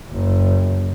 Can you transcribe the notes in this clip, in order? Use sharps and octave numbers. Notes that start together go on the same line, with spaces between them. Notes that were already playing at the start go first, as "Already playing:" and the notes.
F#1